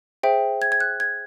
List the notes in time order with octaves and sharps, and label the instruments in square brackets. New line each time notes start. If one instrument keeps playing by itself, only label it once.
[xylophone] G#4 C5 E5 G5
G#6
G#6
F#6
G#6